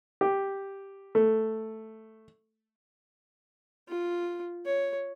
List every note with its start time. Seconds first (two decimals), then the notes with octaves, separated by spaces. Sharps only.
0.21 G4
1.15 A3
3.89 F4
4.66 C#5